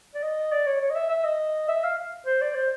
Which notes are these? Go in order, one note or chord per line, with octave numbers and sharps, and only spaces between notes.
D5
D#5
D5
C#5
C#5
D#5
E5
E5
D#5
E5
F5
C5
D5
C5